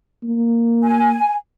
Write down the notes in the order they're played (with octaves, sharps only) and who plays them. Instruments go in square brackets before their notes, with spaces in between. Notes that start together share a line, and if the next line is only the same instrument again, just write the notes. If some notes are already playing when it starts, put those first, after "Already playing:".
[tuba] A#3
[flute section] G#5